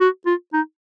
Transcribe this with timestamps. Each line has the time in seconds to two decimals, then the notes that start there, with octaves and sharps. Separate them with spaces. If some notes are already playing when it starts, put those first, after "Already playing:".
0.01 F#4
0.26 F4
0.53 D#4